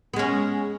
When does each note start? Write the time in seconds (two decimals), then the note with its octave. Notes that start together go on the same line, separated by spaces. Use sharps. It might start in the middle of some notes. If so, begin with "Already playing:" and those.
0.13 B3
0.16 G#3
0.19 C#4